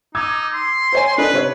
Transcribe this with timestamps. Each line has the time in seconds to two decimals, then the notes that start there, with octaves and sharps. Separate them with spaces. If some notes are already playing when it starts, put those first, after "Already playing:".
0.15 D#4 D6 E6 G#6
0.53 C6
0.92 C5 C#5 G#5
1.18 D4 D#4 A4 B4
1.33 C3 C#5